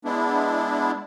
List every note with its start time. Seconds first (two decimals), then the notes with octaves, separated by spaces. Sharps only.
0.05 G#3 B3 D4 E4